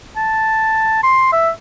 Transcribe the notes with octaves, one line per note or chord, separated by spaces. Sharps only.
A5
C6
E5